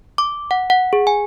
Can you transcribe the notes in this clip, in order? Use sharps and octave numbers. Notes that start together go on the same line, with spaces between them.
D6
F#5
F#5
G#4
G#5